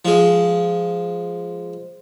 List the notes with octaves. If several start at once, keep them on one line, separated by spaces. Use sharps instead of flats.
F3 G#3